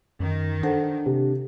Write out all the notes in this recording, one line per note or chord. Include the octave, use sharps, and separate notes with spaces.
F#2 D#3
D4 A4 C5 F#5
C3